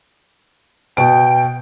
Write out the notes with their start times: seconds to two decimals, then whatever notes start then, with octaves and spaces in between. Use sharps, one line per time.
0.97 B2 G5 D7